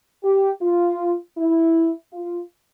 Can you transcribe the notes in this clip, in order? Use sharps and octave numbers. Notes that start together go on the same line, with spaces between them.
G4
F4
E4
F4